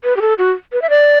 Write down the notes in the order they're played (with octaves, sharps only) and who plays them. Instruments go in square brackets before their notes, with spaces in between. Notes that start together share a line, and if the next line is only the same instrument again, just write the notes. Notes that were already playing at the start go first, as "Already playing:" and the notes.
[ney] B4
G4
A4
F#4
B4
E5
D5